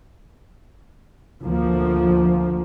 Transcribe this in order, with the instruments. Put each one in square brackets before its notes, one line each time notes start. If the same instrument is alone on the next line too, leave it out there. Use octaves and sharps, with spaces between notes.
[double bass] D2 A#3 [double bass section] F3